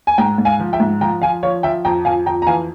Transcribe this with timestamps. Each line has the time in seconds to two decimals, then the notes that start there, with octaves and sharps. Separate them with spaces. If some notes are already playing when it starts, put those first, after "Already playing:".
0.07 G#5
0.18 G#2 G5 A#5
0.38 G#2
0.45 F5 G#5
0.60 F3
0.73 E5 G5
0.80 G#2
1.01 F3 G5 A#5
1.22 F3 F5 G#5
1.43 F3 C#5 F5
1.63 F3 E5 G5
1.85 F2 G5 A#5
2.05 F2 F5 G#5
2.26 F2 G5 A#5
2.42 A#5
2.47 E3 F5 G#5